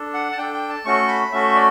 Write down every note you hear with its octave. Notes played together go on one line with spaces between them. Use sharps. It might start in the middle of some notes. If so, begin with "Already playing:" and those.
Already playing: D4 A4
F#5
A5
D4 A4 G5
G5
A5
A3 C#4 F#4 A4 C#6
B5
A3 C#4 F#4 A4 E5
D5